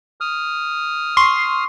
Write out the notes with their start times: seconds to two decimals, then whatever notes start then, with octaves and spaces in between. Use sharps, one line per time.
0.21 D#6 F6
1.17 C6 C#6 C7